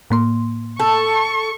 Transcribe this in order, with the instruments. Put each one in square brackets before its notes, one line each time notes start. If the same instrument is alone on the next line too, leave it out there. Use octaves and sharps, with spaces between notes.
[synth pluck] A2 A#3 C6
[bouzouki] A4 [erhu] C#6